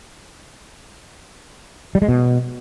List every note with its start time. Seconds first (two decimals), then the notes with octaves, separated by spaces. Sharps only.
1.95 G3
2.02 G#3
2.08 B2